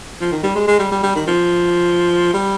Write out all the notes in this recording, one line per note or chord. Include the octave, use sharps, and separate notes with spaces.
F3
D#3
G3
G#3
G#3
G3
G3
G3
D#3
F3
G3